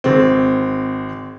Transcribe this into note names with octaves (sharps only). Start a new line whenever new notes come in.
G#1 C4